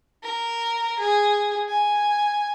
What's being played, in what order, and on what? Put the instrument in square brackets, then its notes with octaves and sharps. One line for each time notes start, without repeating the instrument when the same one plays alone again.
[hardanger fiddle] A#4
G#4
G#5